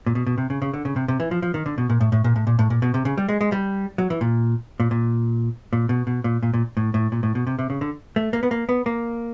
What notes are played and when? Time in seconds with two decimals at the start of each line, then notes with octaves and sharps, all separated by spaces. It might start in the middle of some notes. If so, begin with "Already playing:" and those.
0.06 A#2
0.15 B2
0.26 B2
0.38 C3
0.50 C#3
0.62 C#3
0.74 D3
0.85 C#3
0.96 C3
1.08 C3
1.20 E3
1.31 F3
1.42 F3
1.54 D#3
1.66 D3
1.78 B2
1.90 A#2
2.01 A2
2.12 A2
2.24 A#2
2.36 A2
2.47 A#2
2.59 A2
2.70 A#2
2.82 B2
2.94 C3
3.05 C#3
3.17 G3
3.29 G#3
3.41 G#3
3.52 G3
3.98 F#3
4.10 E3
4.21 A#2
4.80 A#2
4.91 A#2
5.73 A#2
5.89 B2
6.07 B2
6.24 A#2
6.43 A#2
6.54 A#2
6.77 A2
6.94 A2
7.12 A#2
7.23 A2
7.35 B2
7.47 C3
7.59 C3
7.70 C#3
7.81 D3
8.16 A3
8.33 A#3
8.43 B3
8.51 A#3
8.69 B3
8.86 A#3